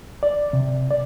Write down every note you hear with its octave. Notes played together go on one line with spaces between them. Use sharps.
D5
C3
D5